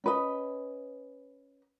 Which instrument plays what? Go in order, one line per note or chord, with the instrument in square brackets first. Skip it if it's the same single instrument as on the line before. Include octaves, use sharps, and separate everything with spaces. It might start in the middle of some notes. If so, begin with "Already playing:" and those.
[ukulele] C#4 B4 D#5